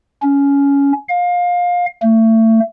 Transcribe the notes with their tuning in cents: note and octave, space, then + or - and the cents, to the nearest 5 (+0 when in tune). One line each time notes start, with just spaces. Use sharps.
C#4 +15
F5 +25
A3 +30